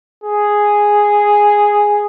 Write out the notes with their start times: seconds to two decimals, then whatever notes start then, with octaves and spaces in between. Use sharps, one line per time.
0.24 G#4